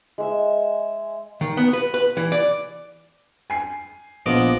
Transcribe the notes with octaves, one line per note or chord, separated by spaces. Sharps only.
G#3 E5
D#3
B3
B4
B4
E3
D5
G#5 C7
A#1 F3 B3 D#5 D6